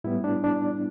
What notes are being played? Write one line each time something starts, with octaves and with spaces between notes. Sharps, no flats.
A2 G3 B3 E4
D4
D4